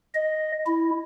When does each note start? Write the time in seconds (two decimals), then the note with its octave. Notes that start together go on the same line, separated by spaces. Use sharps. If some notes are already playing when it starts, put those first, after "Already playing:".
0.15 D#5
0.66 E4